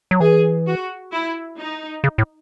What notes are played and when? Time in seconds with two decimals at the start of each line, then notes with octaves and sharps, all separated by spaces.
0.11 F#3
0.20 E3 G#4
0.66 F#4
1.11 E4
1.58 D#4
2.04 C#3
2.18 A2